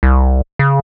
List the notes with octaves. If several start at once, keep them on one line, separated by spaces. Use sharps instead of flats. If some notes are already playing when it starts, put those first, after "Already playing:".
C2
C#3